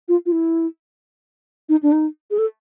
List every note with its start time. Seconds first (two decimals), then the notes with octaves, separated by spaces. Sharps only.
0.08 F4
0.26 F4
0.32 E4
1.69 D#4
1.83 D4
1.92 D#4
2.31 G#4
2.38 A4